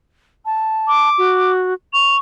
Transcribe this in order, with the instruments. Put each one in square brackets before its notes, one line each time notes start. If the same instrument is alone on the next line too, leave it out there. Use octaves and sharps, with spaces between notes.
[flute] A5
[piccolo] D6
[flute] F#4
[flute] C#6 [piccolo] F7